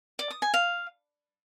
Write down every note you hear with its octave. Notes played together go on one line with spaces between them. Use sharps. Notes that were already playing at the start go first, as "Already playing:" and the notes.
D5
D#6
G#5
F5